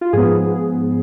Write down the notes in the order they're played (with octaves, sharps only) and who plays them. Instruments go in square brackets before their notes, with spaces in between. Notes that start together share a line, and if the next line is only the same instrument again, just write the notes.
[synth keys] F4
G#2 F3 B3 G#4